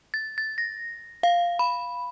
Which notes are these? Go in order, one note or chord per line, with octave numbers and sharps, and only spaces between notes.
A6
A6
A#6
F5
B5